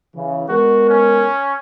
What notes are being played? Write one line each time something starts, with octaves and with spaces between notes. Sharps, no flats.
C#3 E3
G#3 B3 F#4 A#4
C#4